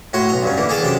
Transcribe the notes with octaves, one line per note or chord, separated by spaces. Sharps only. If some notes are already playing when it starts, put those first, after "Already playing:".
A2 F#4 C#5 C6
B1 A#5
G2 D3 C#4
D3 E3 A#3
G#4 A4 F5 G5 A5
F#2 C3 D4 G5